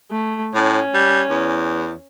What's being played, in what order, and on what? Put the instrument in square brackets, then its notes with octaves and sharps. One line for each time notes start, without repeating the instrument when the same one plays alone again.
[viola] A3
[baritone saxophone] A2 [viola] C#4
[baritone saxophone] G3
E2